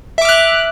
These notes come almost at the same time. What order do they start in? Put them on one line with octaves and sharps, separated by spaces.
E5 D6 F6 F#6